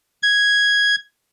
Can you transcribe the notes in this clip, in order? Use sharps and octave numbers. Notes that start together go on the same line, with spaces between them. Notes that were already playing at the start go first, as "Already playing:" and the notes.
G#6